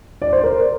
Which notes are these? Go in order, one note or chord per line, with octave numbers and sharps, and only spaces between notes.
D5
C5
A#4